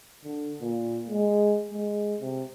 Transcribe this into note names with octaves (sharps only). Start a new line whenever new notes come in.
D3
A#2
G#3
G#3
C3